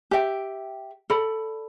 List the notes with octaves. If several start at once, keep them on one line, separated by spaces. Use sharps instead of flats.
G4 E5 G5
A4 D5 B5